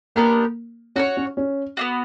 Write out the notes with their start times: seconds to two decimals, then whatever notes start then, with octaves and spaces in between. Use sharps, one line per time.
0.16 A#3 B3 D4 G4 A#4
0.96 C#4 F#4 A4 C#5
1.17 C#4
1.37 C#4
1.77 B3 D4 F#4